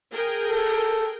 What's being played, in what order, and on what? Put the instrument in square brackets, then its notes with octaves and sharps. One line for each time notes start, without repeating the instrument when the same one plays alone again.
[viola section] G#4 A#4 G5
[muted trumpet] A4